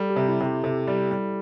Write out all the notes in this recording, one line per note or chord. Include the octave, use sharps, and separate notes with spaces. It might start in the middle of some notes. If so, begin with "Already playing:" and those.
Already playing: G3 A4
G4
C3
E4
C3
G4
C3 A4
G3
G3